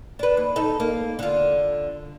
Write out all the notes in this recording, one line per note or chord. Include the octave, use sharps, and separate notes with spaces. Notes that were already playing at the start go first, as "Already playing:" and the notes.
D4 B4
D#2
D#4 A4
A#3
D3 F4